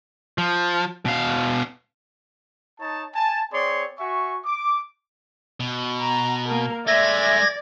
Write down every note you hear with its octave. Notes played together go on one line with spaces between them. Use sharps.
F3
B2 F5
D#4 C#5 A5
G#5 A5
C4 G#4 C#5 D5 C6
F#4 E5 G#5 C#6
D6
B2
A#5
A#3 A#4
G#3 A3 D5 E5 G#6 A#6